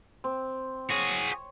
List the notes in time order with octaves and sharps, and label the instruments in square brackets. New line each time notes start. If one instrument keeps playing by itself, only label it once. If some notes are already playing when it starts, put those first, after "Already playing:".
[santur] C4
[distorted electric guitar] F#4 G#4 [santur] C#5